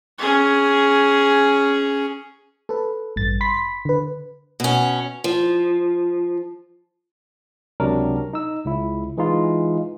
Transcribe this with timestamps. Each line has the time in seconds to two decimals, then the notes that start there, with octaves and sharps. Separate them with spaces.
0.18 C#4 G#4
2.69 A4 B4
3.16 A1 G2 A6
3.41 B5 C6 B6
3.85 D3 B4
4.60 B2 C#4
5.24 F3
7.80 C#2 C3 F#3 D4 A#4
8.33 D#4 E6
8.66 C#2 E4
9.17 E3 G#3 D#4 F4